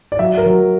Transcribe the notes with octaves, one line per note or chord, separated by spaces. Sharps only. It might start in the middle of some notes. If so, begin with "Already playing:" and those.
D5
F#3 E5
A#4
F#3